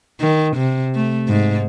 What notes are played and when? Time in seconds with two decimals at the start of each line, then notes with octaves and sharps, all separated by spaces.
0.20 D#3
0.56 C3
0.95 A3
1.28 G#2